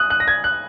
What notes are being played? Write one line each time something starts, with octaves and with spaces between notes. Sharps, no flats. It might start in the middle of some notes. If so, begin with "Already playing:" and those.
Already playing: D#6 F#6
F#6
A#6
G#6
F#6